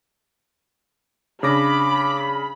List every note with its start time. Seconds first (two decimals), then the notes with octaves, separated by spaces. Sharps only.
1.43 C#3 D4 B5 D6 A#6